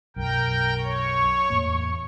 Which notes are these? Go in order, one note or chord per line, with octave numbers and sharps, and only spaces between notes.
B1 F#2 A#4 G5
C#5 C#6
E2 A2 A#3